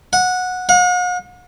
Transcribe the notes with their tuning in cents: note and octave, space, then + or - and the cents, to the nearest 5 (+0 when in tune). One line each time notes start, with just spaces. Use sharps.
F#5 -15
F#5 -45